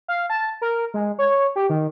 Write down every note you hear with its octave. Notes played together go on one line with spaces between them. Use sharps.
F5
A5
A#4
G#3
C#5
G4
D#3